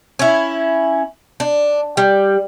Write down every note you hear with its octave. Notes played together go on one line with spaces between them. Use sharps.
C#4 E4
D4
G3